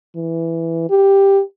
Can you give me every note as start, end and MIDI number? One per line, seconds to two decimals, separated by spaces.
0.16 0.87 52
0.90 1.41 67